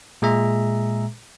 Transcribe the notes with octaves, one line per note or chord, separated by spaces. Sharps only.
A#2 G#3 G#4 E5 A#5